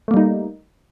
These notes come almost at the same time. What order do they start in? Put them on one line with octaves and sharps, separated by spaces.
A3 A#3 G3 D#4